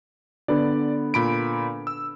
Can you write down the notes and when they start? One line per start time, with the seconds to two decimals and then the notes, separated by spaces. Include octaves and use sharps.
0.48 D3 B3 D5
1.14 A#2 B5 D7
1.87 E6